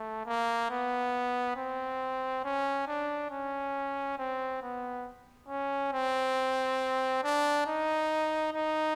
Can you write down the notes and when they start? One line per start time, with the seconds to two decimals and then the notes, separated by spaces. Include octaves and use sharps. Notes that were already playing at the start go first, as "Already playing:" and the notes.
Already playing: A3
0.26 A#3
0.70 B3
1.56 C4
2.44 C#4
2.87 D4
3.30 C#4
4.18 C4
4.62 B3
5.48 C#4
5.92 C4
7.24 D4
7.66 D#4
8.53 D#4